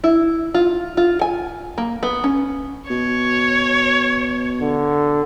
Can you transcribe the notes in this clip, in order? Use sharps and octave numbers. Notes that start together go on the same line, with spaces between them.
E4
F4
F4
G#5
A#3
B3
C#4
B2 C#5
D3